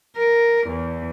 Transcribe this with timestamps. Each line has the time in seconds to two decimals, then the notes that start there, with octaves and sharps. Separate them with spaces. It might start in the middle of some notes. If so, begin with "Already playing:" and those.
0.17 A#4
0.68 E2